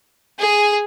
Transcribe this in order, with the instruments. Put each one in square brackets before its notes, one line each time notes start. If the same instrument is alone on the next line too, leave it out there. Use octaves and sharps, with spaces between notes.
[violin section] G#4